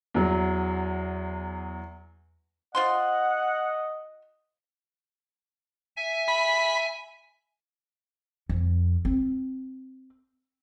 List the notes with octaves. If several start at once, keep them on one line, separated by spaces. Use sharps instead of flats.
E2 F#3
F4 C5 D#5 F#5 C6
E5 G#5
B5
F2
C4